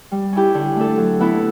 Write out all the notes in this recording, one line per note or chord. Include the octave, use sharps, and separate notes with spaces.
G3
C#4 E4 G4
D3
A3 D4 A4
F#3
B3 E4 A4